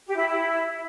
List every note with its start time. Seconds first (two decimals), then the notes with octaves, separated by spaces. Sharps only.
0.07 G4
0.17 E4
0.27 E4